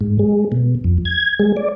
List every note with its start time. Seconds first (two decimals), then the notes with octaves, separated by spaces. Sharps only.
0.01 G#2
0.19 G#3
0.52 B2
0.84 F2
1.05 G#6
1.40 G#3
1.56 D5